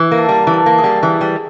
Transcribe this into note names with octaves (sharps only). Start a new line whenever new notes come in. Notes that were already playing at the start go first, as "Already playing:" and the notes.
Already playing: E3
A#3
A4
G3 A#4
E3
A4
A#3
G#4
G3
E3
G3